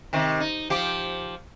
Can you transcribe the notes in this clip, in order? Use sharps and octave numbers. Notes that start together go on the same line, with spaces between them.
C3 D#3
D#4
F3 G4